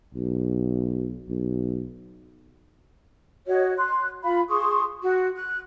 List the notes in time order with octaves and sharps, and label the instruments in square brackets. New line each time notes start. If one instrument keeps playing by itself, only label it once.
[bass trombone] B1
B1
[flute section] F#4 C#5 D#5
C6 F#6
F4 F5 B5
G#4 C6 C#6 D#6
F#4
F#6